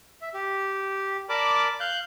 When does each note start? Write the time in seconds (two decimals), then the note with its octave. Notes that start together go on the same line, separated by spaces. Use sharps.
0.22 E5
0.34 G4
1.29 A#4 D5 A5 B5 D6
1.80 F5 F#6 G6